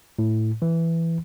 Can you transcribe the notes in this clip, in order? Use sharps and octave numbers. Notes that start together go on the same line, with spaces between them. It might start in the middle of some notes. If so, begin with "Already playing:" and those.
A2
E3